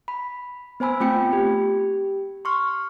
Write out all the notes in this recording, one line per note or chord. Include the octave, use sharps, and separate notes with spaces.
B5
B3 C5 G#5 B5 E6
A3 C4 F4 G5 B5 C#7
G4
C6 C#6 F6